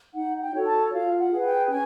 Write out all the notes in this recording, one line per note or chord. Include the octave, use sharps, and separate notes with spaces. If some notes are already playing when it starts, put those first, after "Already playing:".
D#4 F#5
G5
F#4 A4 C#5
A5
F4 F5
F#5
G#4 B4
G5
C#4 G#5